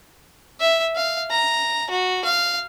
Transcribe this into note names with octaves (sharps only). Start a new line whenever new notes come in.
E5
F5
A#5
F#4
F5